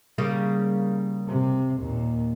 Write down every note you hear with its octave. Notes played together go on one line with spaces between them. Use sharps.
C#3 G3 A#3
C3
D#2 A#2